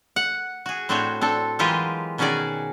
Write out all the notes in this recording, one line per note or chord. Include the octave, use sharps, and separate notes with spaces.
F#5
F#4 G#4
A2 C4 D4 F#4 C5 C#5
C4 D4 A4
E3 F#3 G#3 F4 G4 A#4
B2 D#3 C#4 F#4 G#4 D5